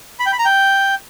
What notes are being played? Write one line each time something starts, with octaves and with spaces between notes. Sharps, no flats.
B5
G5
B5
A#5
G5